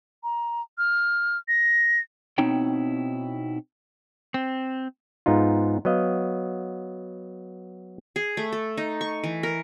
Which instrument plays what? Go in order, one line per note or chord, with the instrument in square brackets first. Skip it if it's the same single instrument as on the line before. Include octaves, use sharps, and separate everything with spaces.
[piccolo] A#5
F6
A#6
[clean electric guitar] B2 C4 D#4 E4 C#5 G5
C4
[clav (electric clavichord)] G#2 B3 D#4 F4
F#3 B3 D#5 F5
[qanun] G#4
A3
A4
D#4
C#6
E3
A#4